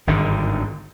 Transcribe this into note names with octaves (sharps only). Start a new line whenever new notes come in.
G#1 G2 D3 D#3